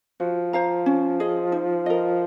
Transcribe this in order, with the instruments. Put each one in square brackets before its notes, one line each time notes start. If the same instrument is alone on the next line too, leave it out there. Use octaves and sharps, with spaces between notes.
[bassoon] F3 [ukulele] F#4
[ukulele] C5 F5 A#5
C#4
G#4 D#5
D#4
A#4 D#5